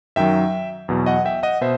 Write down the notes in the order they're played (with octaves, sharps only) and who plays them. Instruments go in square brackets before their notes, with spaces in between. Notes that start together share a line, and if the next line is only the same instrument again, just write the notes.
[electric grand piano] F#2 D#3 F#3 E5 G5
E2 B2 F#3
D#5 F#5
E5 G5
D#5 F#5
B2 C5 E5